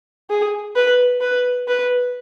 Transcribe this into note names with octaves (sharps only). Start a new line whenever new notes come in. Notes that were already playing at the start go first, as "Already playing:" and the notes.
G#4
B4
B4
B4